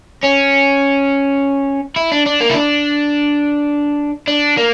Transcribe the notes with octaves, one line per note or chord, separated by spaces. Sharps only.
C#4
E4
D4
D4
A#3
E4
D4
D4
A#3